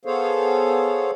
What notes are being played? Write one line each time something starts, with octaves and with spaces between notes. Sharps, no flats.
B3 G#4 A4 C5 C#5 F5